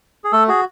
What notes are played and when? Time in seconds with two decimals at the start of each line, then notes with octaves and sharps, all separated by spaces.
0.24 G#4
0.32 A3 A4
0.48 F#4 G#4